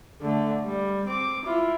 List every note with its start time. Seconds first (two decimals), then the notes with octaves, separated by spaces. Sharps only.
0.21 D3 A3
0.65 G3
1.07 C4 D6
1.44 E4 F4